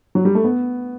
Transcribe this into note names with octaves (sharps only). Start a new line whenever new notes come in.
F#3
G3
A3
B3